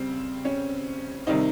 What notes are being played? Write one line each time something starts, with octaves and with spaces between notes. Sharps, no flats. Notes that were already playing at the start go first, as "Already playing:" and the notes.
Already playing: C#3 G3 C4
C#4
C3 D#3 G3 C4 D#4